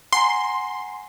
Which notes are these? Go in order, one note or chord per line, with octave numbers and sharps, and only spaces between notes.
F#5 G#5 A#5 C6